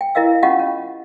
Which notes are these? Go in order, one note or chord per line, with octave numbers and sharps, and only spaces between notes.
G5
E4 A#4 D#5 F5 E6
C#4 F4 G4 D#5 F5 F#5
C#4